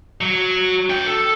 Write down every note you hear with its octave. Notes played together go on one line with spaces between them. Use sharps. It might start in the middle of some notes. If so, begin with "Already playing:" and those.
F#3
D4 G5
A4